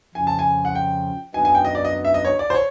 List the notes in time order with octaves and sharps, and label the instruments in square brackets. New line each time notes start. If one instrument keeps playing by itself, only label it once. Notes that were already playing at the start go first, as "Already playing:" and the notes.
[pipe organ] F2 C#3 F3 [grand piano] G#5
[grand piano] A5
G#5
F#5
G5
[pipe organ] F#2 D3 F#3 B3 D#4 [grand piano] G#5
[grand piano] G#5
G5
D#5
D5
D#5
E5
D#5
C#5
D5
C5
C#5